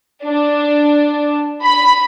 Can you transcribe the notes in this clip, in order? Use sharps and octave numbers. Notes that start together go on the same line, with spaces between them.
D4
B5